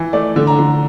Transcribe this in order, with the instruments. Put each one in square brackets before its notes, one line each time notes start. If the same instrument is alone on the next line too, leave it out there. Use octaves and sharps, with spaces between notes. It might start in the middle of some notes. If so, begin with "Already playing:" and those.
Already playing: [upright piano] E3
A3 D5
D3
A#5
D3